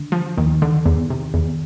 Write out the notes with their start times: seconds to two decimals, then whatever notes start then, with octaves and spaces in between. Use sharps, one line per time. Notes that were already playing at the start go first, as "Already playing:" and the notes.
Already playing: D3
0.12 F3
0.37 D#2 D#3
0.62 D3
0.86 E2
1.10 C3
1.34 E2